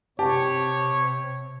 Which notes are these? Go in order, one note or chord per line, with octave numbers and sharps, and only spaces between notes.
C3 G4 C#5 A5